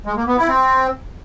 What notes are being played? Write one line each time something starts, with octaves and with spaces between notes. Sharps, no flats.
G#3
A#3
B3
E4
C4